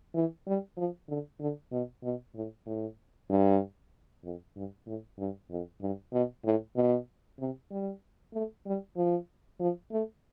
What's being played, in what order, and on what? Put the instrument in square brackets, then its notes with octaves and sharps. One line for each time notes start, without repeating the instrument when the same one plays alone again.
[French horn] E3
G3
F3
D3
D3
B2
B2
A2
A2
G2
F2
G2
A2
G2
F2
G2
B2
A2
B2
C3
G3
A3
G3
F3
F3
A3